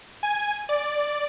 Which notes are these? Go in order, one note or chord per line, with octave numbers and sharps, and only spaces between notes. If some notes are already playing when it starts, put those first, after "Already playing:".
G#5
D5